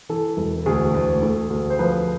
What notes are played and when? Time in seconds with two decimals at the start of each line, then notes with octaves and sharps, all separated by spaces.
0.09 E3 A4
0.37 E1
0.66 D2 G#4
0.94 D2
1.22 A3
1.50 D2
1.70 C5
1.79 F3 B4